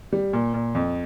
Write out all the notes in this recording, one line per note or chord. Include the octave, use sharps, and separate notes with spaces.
G3
A#2
A#2
F2